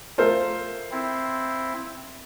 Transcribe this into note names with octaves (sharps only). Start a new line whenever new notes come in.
A3 F4 A4 A#4 C5
C4 E4